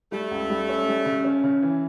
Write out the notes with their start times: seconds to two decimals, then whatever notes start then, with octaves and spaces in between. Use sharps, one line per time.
0.12 G3 A3
0.31 C#2
0.50 G3
0.69 C#4
0.88 G3
1.06 C#3
1.24 C#4
1.44 C#3
1.62 E3